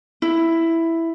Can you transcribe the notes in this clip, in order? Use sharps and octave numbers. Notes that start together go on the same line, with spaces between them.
E4